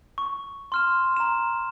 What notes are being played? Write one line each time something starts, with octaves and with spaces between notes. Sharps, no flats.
C#6
C6 F6 E7
A#5 E7